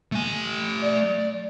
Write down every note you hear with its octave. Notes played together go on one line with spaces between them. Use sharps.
A3 G#5
D5